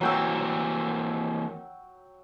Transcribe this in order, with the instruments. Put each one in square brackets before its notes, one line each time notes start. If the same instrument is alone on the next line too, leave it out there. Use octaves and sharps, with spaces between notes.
[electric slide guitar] E3 A#3 C4 [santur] F#3 G5 E6